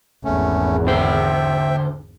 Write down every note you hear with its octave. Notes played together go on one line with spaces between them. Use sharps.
G#1 E2 A3 C#4
D3 C5 E5 G5